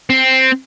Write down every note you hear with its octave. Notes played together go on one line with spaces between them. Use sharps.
C4